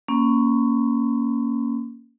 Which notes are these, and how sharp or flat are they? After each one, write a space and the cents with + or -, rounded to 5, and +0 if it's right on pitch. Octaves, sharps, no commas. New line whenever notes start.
A#3 +0 C#4 +0 C6 -45